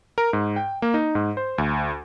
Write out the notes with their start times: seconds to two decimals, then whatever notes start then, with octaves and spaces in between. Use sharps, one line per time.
0.18 A#4
0.33 G#2
0.56 G5
0.82 A#3
0.94 D#4
1.15 G#2
1.37 C5
1.58 D2